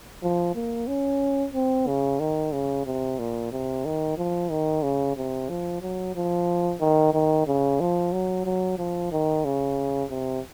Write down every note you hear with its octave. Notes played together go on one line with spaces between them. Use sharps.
F3
A#3
C#4
C4
C#3
D#3
C#3
C3
A#2
C3
D#3
F3
D#3
C#3
C3
F3
F#3
F3
D#3
D#3
C#3
F3
F#3
F#3
F3
D#3
C#3
C3